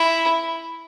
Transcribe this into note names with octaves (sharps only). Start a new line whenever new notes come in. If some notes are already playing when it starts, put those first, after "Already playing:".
Already playing: E4